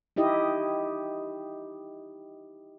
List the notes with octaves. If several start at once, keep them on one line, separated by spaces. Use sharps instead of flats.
D#4 E4 G4 D#5